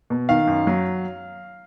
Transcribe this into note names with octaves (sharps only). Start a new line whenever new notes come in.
B2
D#3 F5
F#2
F#3